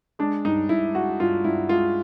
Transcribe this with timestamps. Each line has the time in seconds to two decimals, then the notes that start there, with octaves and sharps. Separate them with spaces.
0.19 G#3 D4
0.45 G2 D#4
0.69 G2 E4
0.95 G#3 F#4
1.20 G2 F4
1.44 G2 E4
1.69 G#3 F4